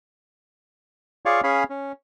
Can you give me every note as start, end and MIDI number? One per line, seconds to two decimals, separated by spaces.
1.26 1.41 65
1.26 1.41 68
1.26 1.41 73
1.26 1.41 74
1.26 1.41 77
1.26 1.41 85
1.44 1.64 61
1.44 1.64 68
1.44 1.64 73
1.44 1.64 77
1.44 1.64 80
1.44 1.64 83
1.70 1.92 61